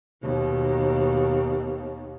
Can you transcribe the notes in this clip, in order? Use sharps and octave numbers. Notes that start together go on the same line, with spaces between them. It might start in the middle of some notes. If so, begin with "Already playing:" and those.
D#2 B2